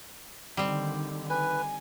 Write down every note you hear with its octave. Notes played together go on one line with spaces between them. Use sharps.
D3 D#3 G3 C4
B4 G#5